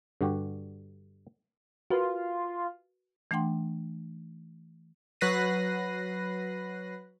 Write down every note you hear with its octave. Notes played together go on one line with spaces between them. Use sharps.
G2 D3 F#4 G4
F4 F#4 A#4 B4
E3 A3 D4 F#5 G5 C6
F#3 B4 F#6 A#6 C7 D#7